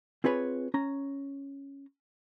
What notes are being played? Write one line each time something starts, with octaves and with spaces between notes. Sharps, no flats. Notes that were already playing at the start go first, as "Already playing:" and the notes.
C4 F4 G#4 B4 C#5
C#4 A#5